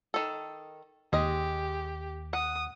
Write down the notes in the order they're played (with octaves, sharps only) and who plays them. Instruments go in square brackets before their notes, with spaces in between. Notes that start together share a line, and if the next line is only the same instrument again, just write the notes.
[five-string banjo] D#3 A4
[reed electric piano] D#2 [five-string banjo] G#3 D#5 [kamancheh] G4
[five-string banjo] F#5 [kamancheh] D#6